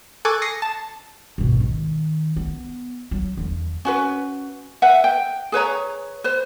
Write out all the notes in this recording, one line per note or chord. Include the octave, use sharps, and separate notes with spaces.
A4 G#5 C#6 D6 F#6 G#6
D#6 A#6 C7 C#7
A5
G#1 B2
D#3
B3
F#3
E2 D3
C#4 F#4 B4
B4 E5 F#5
G5
G#4 B4 C#5 A#5
B4 C5